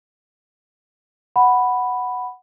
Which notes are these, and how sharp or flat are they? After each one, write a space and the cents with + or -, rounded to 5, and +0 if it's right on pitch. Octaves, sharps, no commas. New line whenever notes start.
F#5 +0 B5 +0